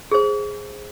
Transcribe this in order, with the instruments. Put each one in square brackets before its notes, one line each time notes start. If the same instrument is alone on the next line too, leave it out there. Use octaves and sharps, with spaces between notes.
[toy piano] G#4 C5